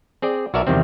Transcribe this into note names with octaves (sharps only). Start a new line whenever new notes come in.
C4 G#4 D5
B1 F#4 A#4 D5 E5 A5
E2 C3 D#3 G3 C4